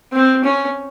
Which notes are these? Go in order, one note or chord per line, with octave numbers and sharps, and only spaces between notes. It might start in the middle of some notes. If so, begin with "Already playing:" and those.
C4
C#4